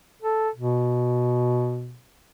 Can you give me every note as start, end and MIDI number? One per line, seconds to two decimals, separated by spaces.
0.22 0.49 69
0.55 1.97 47